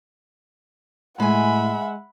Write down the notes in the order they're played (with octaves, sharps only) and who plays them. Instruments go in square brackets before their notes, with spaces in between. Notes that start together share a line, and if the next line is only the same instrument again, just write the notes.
[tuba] A2 [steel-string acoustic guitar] G#3 G#5 [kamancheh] E5 F#5 [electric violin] B5